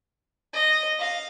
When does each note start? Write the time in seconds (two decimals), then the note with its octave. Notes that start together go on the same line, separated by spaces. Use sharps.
0.53 D#5
0.99 F5